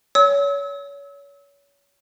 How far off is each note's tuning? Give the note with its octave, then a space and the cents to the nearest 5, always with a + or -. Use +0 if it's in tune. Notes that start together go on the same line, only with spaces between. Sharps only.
C#5 +30 E6 -35